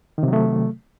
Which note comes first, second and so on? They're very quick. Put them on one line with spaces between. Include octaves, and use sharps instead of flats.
D#3 C3 F#3 A3